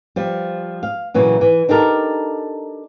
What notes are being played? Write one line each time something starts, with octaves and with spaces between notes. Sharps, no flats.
F3 G3
F5
A#2 C#3 E3 F#3
E3
D4 D#4 G4 A4 A#4